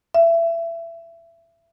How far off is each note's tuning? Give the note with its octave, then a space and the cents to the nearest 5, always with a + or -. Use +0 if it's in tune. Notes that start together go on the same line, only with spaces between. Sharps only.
E5 +25